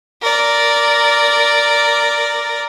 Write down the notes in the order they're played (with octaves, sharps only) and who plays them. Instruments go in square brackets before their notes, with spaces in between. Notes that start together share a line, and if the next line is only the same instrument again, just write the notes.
[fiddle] A#4 D5